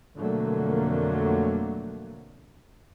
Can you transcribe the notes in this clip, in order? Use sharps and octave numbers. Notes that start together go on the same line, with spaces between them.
F2 B2 D3 F#3 A3 A#3